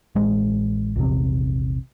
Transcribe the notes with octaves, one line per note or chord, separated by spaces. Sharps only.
A1 G#3
A#1 E2 C3